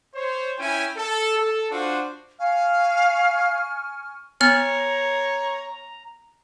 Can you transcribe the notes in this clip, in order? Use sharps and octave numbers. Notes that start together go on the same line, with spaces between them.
C5 C#5
C#4 E4 G5 G#5
A4
A4
D4 F4 F#4 C5
F5 G#5 C#6 F6
B3 C#5 A#5 F6